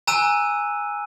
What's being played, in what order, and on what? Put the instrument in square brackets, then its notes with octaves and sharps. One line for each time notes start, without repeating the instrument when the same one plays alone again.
[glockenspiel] G#5 A#5 E6 F#6 D#7